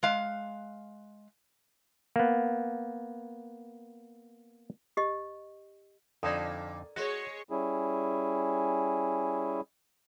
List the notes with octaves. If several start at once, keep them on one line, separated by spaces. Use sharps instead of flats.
G#3 F5
A#3 B3
G4 D#5
F2 A#2 D3 D#4 A4 D5
G#3 F#4 C#5
G3 C#4 E4 G#4